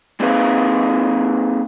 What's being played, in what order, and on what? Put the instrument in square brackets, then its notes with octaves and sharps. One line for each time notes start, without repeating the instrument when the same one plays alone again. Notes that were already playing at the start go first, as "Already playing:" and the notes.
[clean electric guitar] A#3 C4 D#4 G#4 B4 F5